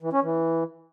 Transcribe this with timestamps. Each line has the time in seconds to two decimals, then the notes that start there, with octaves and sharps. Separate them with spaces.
0.03 E3
0.13 C#4
0.23 E3